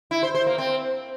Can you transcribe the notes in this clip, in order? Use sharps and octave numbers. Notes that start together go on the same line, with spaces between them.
E4
C5
C5
A#3
C4